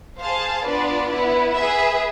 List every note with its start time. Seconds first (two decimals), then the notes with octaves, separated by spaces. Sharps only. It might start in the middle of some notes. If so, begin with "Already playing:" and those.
0.22 G#4 C5 F5 A5
0.67 B3 D4 F4 B4 D5
1.12 B3 E4 B4
1.56 G#4 B4 E5